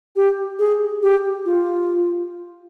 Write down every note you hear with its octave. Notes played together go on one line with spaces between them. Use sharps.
G4
G#4
G4
F4